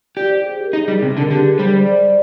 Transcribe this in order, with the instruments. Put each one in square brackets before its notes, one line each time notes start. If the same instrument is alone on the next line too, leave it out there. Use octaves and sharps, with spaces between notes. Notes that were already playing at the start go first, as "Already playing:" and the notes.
[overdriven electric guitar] G4 [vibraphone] D5
[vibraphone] C5
G#4
G4
A#4
[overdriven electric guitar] D#4 [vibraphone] G#4
[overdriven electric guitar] G3 [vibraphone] G#4
[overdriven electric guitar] C3
[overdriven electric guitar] D3 [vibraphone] G#4
[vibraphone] A#4
[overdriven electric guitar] D3 [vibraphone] G4
[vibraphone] G#4
[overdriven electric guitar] G3 [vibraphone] C5
[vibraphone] C5
D5
C5
D5
D5